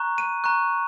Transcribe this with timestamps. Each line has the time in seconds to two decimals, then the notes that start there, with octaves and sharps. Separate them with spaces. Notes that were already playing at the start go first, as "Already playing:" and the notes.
Already playing: A#5 C#6 F#6
0.18 D#7
0.44 A#5 C#6 F#6